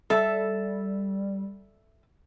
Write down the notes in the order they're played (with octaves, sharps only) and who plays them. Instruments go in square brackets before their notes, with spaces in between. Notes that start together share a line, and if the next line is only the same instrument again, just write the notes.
[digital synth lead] G3 [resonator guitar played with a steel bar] A4 E5